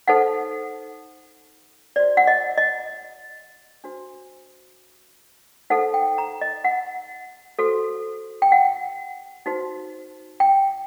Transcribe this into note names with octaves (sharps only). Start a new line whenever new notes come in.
D#4 A4 C5 F#5
F#4 C5 D5
F#5
D#5
D#5
D4 F#4 C5
D#4 A4 C5 F#5
G5
A#5
D#5
F#5
F#4 A4 C5
G5
F#5
D#4 F#4 C5
G5